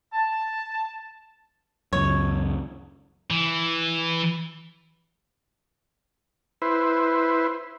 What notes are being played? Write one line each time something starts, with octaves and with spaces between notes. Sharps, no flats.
A5
C#2 F#2 C#5
E3
E4 B4 C5